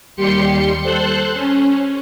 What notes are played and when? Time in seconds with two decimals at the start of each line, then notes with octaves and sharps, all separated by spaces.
0.16 D#2 G3 G4 C6 C#7
0.83 A4 C5 C6 F#6
1.34 C#4